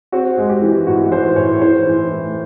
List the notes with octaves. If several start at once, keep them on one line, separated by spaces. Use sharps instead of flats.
C4 F#4
G#3
G4
E3
A2 F#4
E3 C5
A2 C#5
E3 C5
E3
A3